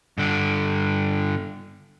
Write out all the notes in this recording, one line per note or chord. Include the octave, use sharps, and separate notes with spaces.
G2 D3